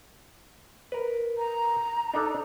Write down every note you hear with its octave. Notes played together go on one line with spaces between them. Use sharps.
A#4 B4
A#5
D4 D#4 A4